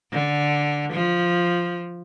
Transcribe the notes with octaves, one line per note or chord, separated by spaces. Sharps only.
D3
F3